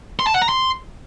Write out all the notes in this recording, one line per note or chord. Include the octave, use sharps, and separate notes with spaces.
C6
A5
F#5
A#5
C6